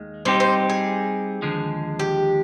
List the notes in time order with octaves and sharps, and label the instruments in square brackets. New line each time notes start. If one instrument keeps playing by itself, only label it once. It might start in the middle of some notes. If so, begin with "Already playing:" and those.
Already playing: [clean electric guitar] D#2 D#3 G#3
[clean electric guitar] G3 C4 D#4 G4 [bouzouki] C5
[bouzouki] C5
G#4
[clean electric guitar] D#2 D3 F3 G#3
[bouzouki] G4